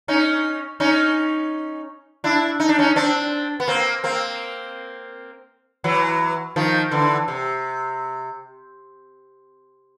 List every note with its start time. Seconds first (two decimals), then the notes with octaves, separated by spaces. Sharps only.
0.08 C#4 D#4
0.80 C#4 D#4
2.24 D4 E4
2.60 D#4
2.69 D4
2.79 C#4 D#4
2.96 C4 D4
3.60 B3
3.68 A#3 C4
4.04 A#3 C4
5.84 E3 F#3
6.56 D#3 F3
6.91 D3 E3
7.28 C3